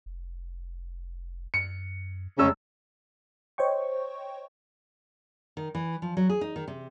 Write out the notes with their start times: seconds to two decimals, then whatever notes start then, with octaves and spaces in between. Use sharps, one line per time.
0.06 F1
1.54 F#2 C#7
2.39 F1 C#3 G#3 C#4 E6
3.58 C5 C#5 D#5 G5 C#6
5.57 D#3
5.75 E3
6.02 F3
6.17 F#3
6.29 G#4
6.41 D#4
6.56 D#3
6.68 C3